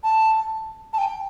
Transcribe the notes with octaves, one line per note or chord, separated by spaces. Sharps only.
A5
A5
G5